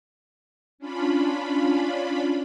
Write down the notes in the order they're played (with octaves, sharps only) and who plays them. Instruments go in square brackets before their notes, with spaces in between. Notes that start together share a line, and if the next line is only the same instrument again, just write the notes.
[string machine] C#4 D4 F4 B5